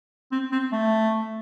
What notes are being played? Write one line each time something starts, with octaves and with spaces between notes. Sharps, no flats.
C4
C4
A3